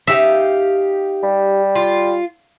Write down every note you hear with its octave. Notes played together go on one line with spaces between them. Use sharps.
D#4 G4 E5 F5
G3
F4